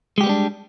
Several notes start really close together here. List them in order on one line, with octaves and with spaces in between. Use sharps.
G#3 G4 G3 B3 D4